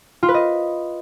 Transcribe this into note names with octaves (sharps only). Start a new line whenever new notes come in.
F4
B4
D#5